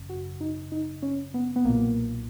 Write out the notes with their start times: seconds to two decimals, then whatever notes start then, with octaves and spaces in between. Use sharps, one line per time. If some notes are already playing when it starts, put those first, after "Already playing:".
Already playing: G#1 F#2 C#3
0.09 F#4
0.41 D#4
0.72 D#4
1.02 C#4
1.34 B3
1.56 B3
1.65 B1 A#2 A#3